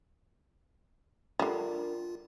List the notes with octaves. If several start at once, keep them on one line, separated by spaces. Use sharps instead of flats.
D3 G3 D4 F4 A#4